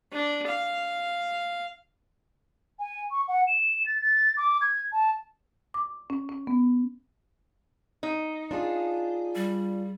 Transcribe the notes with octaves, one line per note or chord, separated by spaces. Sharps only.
D4
F5
G#5
C#6
F#5
E7
A6
A6
D6
G#6
A5
D6
C#4
C#4
B3
D#4
D4 F4 G#4
G3